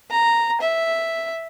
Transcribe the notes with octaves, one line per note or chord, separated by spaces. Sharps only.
A#5
E5